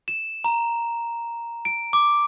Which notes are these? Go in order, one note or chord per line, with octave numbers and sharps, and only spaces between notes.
E7
A#5
D7
D6